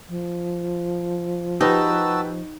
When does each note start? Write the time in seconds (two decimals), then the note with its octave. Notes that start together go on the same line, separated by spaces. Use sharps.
0.09 F3
1.61 D#4 F#4 G4 B4 A5 E6